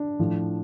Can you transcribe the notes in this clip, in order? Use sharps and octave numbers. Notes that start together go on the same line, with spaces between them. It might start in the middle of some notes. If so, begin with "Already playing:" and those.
Already playing: D4
A2 F3